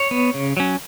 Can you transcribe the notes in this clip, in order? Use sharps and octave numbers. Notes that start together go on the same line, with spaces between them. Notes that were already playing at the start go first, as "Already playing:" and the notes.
Already playing: C#5
B3
C#3
F#3 C#4